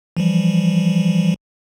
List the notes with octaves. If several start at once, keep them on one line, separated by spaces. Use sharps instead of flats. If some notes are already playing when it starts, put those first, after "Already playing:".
E3 F3 G3